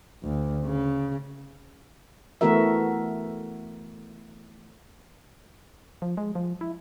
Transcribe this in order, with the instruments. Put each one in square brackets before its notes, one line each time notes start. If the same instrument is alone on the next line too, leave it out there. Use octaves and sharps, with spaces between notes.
[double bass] D2
C#3
[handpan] E3 A3 B3 F#4 A#4 E5
[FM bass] F3
G#3
F3
E4